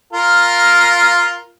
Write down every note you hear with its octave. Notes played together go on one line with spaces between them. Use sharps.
F4 A#4